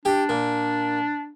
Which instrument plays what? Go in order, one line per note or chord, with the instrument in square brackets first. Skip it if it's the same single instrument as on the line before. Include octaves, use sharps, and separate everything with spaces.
[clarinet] D4 [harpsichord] G4
[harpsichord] A#2